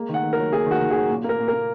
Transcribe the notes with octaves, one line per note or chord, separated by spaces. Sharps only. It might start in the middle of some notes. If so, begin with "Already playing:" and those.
Already playing: G#3 A#3
D#3
F#5
D#3
F#3 A#4
A#3 G#4
D#3 F#4
D#3
F#3 G#4
A#2
A#3 A#4
A#2
A#4
A#3